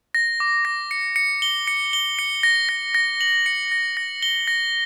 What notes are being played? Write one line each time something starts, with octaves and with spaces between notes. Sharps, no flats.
A#6
D6
A#6
C#7
C#7
G7
C#7
G7
C#7
A#6
A#6
A#6
F#7
C#7
A#6
A#6
G7
A#6